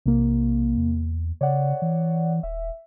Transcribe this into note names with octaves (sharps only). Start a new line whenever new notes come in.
B1 C3 A#3
E2
C#3 C#5 D5 F#5
E3
D#1 E5